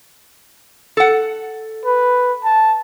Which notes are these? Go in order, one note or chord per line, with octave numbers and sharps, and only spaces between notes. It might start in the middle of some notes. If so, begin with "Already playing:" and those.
A4 F#5
B4
A5